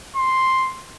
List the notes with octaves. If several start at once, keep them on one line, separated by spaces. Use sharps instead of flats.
C6